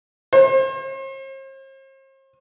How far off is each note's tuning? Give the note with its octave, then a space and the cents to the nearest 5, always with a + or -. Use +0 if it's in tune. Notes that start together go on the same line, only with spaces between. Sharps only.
C5 +45